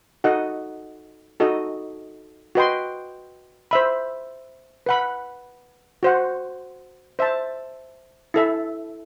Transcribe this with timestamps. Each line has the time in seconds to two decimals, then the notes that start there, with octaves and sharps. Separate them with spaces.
0.24 D#4 F#4 A4 D#5 F#5
1.40 D#4 F#4 A4 D#5
2.55 F#4 B4 D#5 G5 C6
3.71 C5 E5 B5
4.86 B4 F#5 B5
6.03 F#4 C5 F#5
7.19 C5 E5 A5
8.34 E4 A4 E5